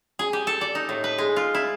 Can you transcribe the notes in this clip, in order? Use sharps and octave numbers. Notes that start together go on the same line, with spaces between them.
G#4
G4
A4
D5
D#4
A2
B4
G#3
F4
E4